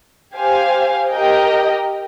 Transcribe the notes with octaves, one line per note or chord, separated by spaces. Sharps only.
G4 C5 F5 G#5
G4 A#4 D#5 G5